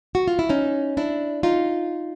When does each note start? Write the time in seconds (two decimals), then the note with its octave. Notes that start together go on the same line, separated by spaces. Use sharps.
0.15 F#4
0.28 F4
0.39 E4
0.49 C#4 D#4
0.97 D4 E4
1.43 D#4 F4